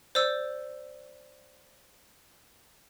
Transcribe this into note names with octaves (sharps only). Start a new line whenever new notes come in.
C5 D5 E6